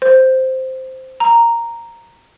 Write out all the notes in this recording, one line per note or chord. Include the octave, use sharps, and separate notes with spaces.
C5
A#5